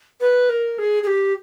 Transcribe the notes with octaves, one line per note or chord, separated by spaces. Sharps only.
B4
A#4
G#4
G#4
G4